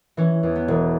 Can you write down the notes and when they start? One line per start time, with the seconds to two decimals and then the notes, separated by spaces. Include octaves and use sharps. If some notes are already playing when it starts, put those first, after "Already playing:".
0.17 E3 C#4
0.43 E2
0.55 B3
0.68 E1